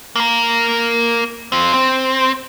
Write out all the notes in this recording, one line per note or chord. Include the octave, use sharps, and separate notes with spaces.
A#3 A#4
C4 F4
C4